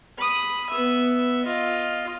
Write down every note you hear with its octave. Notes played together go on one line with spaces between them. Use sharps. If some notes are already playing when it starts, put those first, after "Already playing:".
B5 D#6
B3 E5
F4 D#5